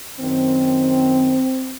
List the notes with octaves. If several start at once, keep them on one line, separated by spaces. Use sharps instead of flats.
F#2 D#3 C4